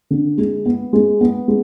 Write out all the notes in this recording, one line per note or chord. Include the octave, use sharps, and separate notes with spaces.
D3
G#3
B3
G#3
B3
G#3